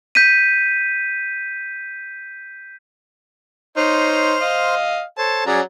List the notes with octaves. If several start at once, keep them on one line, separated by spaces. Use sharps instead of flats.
G6 B6 D#7
D#4 C5 C#5 C6 F6
D#5 F5
A4 C5 C#5 A5
F#3 C#4 G#4 D5 A#5